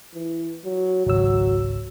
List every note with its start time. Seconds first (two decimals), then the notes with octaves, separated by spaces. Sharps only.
0.14 E3
0.65 F#3
1.06 G#1 C#2 F#3 E6